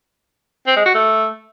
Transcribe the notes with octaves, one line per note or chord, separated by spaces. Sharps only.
C4
G#3
F#4
A3